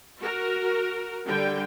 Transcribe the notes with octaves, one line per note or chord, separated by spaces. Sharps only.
F#4 A#4
D3 G3 G5